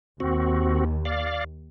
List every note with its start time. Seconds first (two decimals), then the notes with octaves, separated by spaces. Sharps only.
0.20 D#2 C4 F#4
1.05 D5 F5